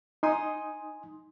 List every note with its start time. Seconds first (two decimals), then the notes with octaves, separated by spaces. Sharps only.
0.23 D#4 G#5 C6 D#6